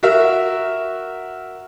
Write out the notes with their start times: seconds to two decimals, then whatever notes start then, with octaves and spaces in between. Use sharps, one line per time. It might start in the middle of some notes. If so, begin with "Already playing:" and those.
0.03 F#4 A#4 E5